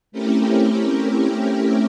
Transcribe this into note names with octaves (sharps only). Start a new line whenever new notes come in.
A3 C4 C#4 E4 G4 A#4